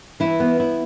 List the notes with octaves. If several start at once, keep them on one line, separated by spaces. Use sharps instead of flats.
E3 E4
B3
E4